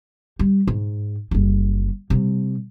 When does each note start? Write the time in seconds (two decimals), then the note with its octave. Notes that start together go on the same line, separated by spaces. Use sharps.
0.39 G3
0.67 G#2
1.31 F#1 G3
2.10 C3 G3